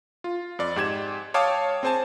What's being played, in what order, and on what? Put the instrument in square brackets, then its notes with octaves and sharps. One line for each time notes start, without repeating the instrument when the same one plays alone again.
[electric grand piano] F4
F2 D5
G#2 G4 G#6 E7
C#5 F5 G5 A5 D6 D#6
C4 G#4 C5 G#5 A5